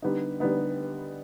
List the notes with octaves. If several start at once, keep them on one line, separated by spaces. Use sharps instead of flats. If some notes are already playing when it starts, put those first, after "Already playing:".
D3 G3 B3 D#4
D3 G3 B3 D#4